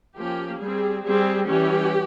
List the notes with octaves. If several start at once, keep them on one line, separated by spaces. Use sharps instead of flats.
F3 A#3 C#4 G4
G3 C4 G#4
G3 C4 G#4
E3 G3 C#4 G4